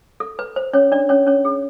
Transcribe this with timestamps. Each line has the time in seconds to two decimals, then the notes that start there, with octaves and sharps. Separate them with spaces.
0.20 A4
0.39 B4
0.56 C5
0.73 C#4 C#5
0.92 D4 D5
1.09 C#4 C#5
1.27 C#4 C#5
1.45 G#4